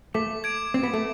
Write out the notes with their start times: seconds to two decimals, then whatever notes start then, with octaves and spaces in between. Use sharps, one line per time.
0.14 A3 D6
0.44 G#6 D7
0.74 C4 D6
0.83 B3
0.94 A3